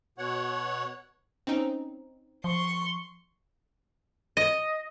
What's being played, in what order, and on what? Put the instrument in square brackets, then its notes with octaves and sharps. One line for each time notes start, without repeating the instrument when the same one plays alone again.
[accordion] B2 C#5 F#5
[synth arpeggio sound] C4 C#4 D#4
[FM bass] F3 [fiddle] C6 C#6
[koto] D#5